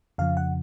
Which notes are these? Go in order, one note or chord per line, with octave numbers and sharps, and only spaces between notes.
F2 C#3 F3 F5
F#5